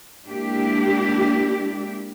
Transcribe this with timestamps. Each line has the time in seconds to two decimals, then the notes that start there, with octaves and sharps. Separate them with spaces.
0.26 G#3 A#3 D4 E4 G4